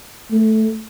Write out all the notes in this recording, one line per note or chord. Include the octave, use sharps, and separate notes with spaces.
A3